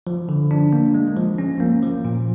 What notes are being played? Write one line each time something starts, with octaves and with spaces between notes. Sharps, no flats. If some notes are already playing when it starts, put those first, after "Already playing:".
F3
D3
D4
A#3
G#3
F3
C#4
A#3
F3
A#2